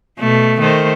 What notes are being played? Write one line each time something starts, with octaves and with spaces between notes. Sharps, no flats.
B2 A3
D#3 A3 C5